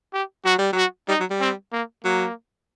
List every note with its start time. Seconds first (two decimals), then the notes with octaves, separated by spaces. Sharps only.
0.13 G4
0.45 F#3 F#4
0.58 G3
0.73 F#3 F#4
1.08 G3 D#4
1.20 F#3
1.30 G3
1.40 C4
1.73 A#3
2.04 F#3 A#3